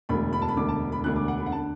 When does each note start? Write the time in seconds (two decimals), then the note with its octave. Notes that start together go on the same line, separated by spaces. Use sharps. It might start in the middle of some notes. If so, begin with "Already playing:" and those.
0.09 E1 D2 D3 B5
0.33 B5
0.42 A5
0.48 B5
0.56 E1 D2 D3 D6
0.69 A5
0.92 B5
1.04 E1 D2 D3 F#6
1.16 D6
1.28 F#5
1.40 B5
1.46 F#5
1.52 A5
1.55 D3